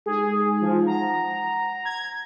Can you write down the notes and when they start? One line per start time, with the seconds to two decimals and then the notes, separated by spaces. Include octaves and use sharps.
0.06 G#3 D#4 G#4
0.61 F3
0.86 F#5 A#5
1.85 G#6